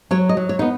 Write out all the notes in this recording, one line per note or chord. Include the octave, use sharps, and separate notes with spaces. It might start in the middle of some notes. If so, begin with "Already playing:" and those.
F#3 C#5
D#5
F#3
C#5
B3 D#4